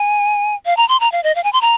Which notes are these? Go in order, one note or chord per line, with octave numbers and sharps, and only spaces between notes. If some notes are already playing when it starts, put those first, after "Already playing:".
Already playing: G#5
F5
A#5
C6
A#5
F5
D#5
F5
G#5
C6
A#5